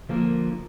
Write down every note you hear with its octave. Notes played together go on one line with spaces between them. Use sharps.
D3 F3 A#3 A#4